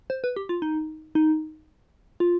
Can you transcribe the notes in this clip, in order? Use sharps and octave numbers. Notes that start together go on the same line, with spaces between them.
C5
B4
G4
F4
D#4
D#4
F4